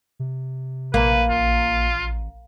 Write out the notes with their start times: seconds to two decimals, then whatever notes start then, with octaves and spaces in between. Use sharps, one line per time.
0.20 C3
0.94 A#1 A#3 B4 A#5
1.30 A1 F4